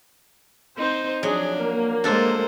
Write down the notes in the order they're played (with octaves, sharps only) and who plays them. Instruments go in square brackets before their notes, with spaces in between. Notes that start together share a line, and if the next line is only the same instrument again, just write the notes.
[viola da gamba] C4 D#4 [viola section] C5
[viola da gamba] F3 D4 [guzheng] F#3 [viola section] G#4
[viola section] A#3
[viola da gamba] G#3 C5 [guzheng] D4 A4